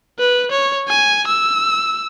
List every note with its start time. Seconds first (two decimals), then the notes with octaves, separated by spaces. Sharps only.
0.19 B4
0.51 C#5
0.88 G#5
1.27 E6